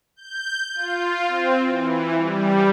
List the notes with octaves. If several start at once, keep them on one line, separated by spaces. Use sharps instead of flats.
G6
F4
C4
E3
G3